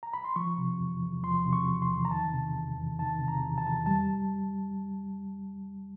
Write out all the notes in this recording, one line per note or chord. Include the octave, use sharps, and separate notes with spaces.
A#5
B5
C6
F3 C#6
C3
E2
E2
F3 C6
C3
C#6
E2
C6
E2
A#5
D#3 A5
C3
E2
E2
D#3 A5
C3
A#5
E2
A5
E2
G3 A5